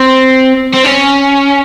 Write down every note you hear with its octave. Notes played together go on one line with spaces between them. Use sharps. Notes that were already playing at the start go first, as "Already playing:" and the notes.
Already playing: C4
C4
C#4